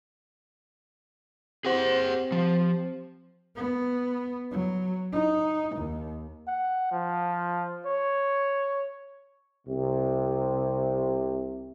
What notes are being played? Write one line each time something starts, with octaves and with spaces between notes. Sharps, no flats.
C4 G4 G#4 C5 F#5
F3
B3
F#3
D#4
D#2
F#5
F3
C#5
C2 C3